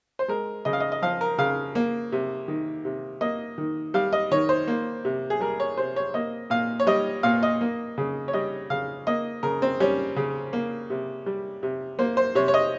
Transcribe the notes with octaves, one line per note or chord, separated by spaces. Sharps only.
C5
G#3 A#4
C#3 D#5
F5
D#5
D#5
F3 F5
A#4
C#3 F5
A#3
C3
D#3
C3
A#3 D#5
D#3
G3 F5
D#5
D#3 C#5
C5
A#3
C3
G#4
G3 A#4
C#5
C3 C5
C#5
A#3 D#5
A#2 F5
C#5
G3 D#5
A#2 F5
D#5
A#3
C#3
C#5
G3 D#5
C#3 F5
A#3 D#5
C#3 A#4
C4
G3 C#4
C#3
A#3
C3
G3
C3
A#3 C5
C5
C3 C#5
C#5
D#5